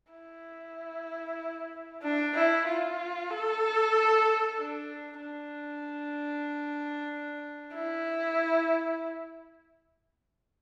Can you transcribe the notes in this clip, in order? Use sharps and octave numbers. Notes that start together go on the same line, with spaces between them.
E4
D4
E4
F4
A4
D4
D4
E4